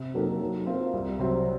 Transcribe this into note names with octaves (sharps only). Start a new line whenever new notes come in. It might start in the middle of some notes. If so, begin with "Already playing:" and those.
Already playing: C3
F#3 A#3 D#4 A4
F#3
C4 F4 A#4
C2
C3 F#3 C4